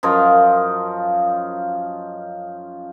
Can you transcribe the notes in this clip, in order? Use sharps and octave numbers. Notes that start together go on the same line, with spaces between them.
F#2 F3 F4 D#5